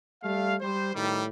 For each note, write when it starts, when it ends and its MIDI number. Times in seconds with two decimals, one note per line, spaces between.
0.22 0.55 55
0.22 0.55 57
0.22 0.55 77
0.60 0.94 55
0.60 0.94 72
0.94 1.26 45
0.94 1.26 51
0.94 1.26 55